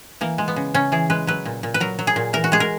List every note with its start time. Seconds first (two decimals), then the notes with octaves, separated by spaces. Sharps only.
0.21 E3 A#3
0.38 G#3
0.48 B3
0.56 C#3
0.74 C#3 C#4
0.92 E3 G#4
1.10 G#3 B4
1.27 F#3 B4
1.45 A#2
1.63 A#2
1.74 B4
1.80 F#3 A#4
1.99 F#3
2.07 G#4
2.16 A#2
2.33 E3 A#4
2.44 F#4
2.52 G#3 G#4
2.60 A#4